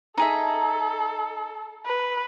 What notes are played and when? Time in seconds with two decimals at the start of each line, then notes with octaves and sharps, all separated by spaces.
0.17 D#4 G#4 A4 E5
1.86 B4